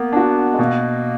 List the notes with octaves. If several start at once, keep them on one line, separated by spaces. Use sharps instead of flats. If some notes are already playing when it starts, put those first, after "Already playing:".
Already playing: A#3 B3
D4 F#4
G#3
B2 A#3